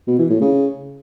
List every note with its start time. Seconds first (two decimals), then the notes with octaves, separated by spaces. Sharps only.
0.08 B2
0.19 E3
0.30 A2
0.41 C#3